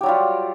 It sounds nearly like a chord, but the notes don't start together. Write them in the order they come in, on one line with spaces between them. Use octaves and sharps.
G4 F#3 G3 F4